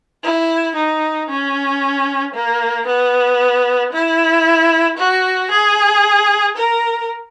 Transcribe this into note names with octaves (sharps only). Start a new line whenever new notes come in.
E4
D#4
C#4
A#3
B3
E4
F#4
G#4
A#4